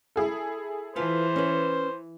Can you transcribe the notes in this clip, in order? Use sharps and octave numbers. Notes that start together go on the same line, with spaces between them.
E4 G#4 A4
E3 F4 B4 C5 A5
C#4 B4